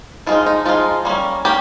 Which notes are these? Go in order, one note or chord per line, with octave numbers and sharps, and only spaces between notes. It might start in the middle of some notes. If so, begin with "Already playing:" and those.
F3 G#3 D#4 F4
D#4
F3 G#3 D#4 F4
G3 A#3 C#4
A#3 C#4 G4